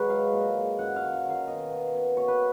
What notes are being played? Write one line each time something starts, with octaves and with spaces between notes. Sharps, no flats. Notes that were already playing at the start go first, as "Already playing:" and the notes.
Already playing: G#2 F#3 B4 C#5
G#3 F5
A#2
G#3
F#2 F#5
F5
D#3
F#5
D#3
F5
B2 D#5
B2
B2
B2 C#5
B4